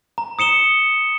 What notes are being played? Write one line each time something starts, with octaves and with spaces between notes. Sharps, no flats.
A#5
D#6 C#7 E7 G7